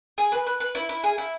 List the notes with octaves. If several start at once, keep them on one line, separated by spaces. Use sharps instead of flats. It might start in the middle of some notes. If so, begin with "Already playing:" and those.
G#4
B4
B4
B4
E4
E4
G#4
E4